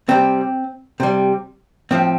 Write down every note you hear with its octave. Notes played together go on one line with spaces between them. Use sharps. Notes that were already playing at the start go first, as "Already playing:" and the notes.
C3 G3 C4
C3 G3
A2 F3 C4